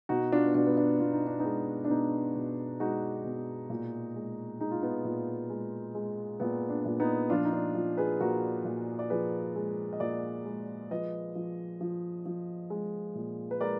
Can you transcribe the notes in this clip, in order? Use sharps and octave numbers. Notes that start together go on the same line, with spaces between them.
B2 D#4 F#4
D4 F4
B3
B2 D4
B3
D4
B2 F4
D#4
D4
B3 D#4
G#3
D4
B2 B3 D#4
B2
G#3 D#4 F#4
B2
A#2
G#3
G#3 D#4
F4
B3 D#4
A#2
G#3
G#3
A#2 B3
D4
A#2
B3 D#4
F3 D4 F4
D#4
D4
F3
G#4 B4
A#2 F#4 A#4
A#2
D5
F3 G#4 B4
G#3
D#5
A#2 A#4 D5
G#3
F3 B4 D#5
F3
F3
F3
G#3
A#2
B4
G#3 A#4 D5